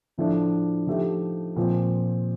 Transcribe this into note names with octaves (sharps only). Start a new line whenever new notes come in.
A2 F3 A3 D4
F3 A3 D#4 G4
A#2 F3 C4